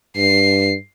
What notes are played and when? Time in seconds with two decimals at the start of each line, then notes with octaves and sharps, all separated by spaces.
0.17 G2 C7